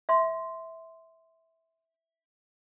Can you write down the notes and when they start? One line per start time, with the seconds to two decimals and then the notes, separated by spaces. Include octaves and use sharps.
0.09 E5 C6